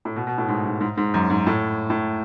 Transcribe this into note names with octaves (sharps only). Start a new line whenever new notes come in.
A2
B2
B2
A2
G#2
G#2
G#2
G#2
F#2
G#2
A2
A2